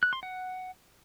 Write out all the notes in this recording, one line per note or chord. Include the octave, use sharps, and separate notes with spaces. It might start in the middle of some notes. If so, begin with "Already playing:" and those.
F#6
C6
F#5